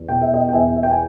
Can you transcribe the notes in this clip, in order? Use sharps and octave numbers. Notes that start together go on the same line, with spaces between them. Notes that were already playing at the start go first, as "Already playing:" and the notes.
Already playing: E2
B2 G5
E5
D#5 G5
G5
E2 E5 G#5
E5
G5
G#5